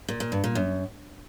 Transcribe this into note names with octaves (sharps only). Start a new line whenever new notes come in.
A#2
A#2
G2
A#2
F#2